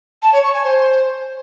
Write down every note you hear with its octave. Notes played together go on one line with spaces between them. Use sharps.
A5
C#5
C#6
G#5
C5